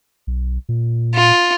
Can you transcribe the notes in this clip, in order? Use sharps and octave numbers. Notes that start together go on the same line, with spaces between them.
B1
A#2
F4